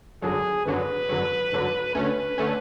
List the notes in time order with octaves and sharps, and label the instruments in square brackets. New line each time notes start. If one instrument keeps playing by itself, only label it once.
[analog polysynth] G#1 F#2 D3 F#3 [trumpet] G#4
[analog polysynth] G#1 F#2 D3 F#3 [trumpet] B4
[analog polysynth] G#1 F#2 D3 F#3
G#1 F#2 D3 F#3
[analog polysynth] D2 D3 A3 C#4 [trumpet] B4
[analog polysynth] D3 A3 C#4